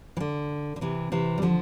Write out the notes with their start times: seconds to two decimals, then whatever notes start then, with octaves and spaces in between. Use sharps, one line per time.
0.17 E3
0.20 D3
0.76 D3
0.81 C3 E3
1.12 C3 E3
1.38 G3
1.42 D3 F3